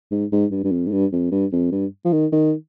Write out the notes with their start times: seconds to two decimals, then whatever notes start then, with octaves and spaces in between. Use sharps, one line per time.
0.11 G#2
0.32 G#2
0.51 G2
0.64 G2
0.71 F2
0.86 G#2
0.91 G2
1.12 F2
1.31 G2
1.52 F2
1.71 G2
2.05 F3
2.12 D#3
2.32 D#3